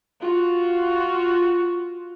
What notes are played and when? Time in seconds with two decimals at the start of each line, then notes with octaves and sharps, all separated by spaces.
0.20 F4 F#4